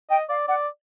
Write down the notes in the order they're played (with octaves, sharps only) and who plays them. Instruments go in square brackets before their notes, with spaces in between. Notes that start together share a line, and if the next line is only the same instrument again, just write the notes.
[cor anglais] D#5 [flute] G5
[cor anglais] D5 [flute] F5
[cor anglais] D5 [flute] F#5